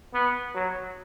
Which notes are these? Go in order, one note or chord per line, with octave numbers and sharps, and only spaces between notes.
B3
F#3